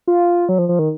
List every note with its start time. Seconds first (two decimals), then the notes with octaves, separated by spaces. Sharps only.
0.07 F4
0.49 F#3
0.59 F3
0.69 F3
0.79 D#3